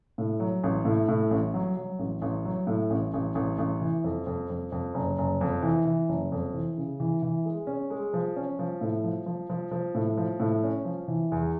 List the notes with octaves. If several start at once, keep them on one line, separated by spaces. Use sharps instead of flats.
A2
F#3
A1
A2
A2
A1
F#3
F#3
A1
A1
F#3
A2
A1
A1
A1
A1
E3
F2
F2
F2
F2
F#1
F#1
F2
E3
E3
F#1
F2
E3
C#3
E3
E3
G#3
C#4
G#3
F3
C#4
F3
A2
F3
F3
F3
F3
A2
F3
A2
C#4
F3
E3
E2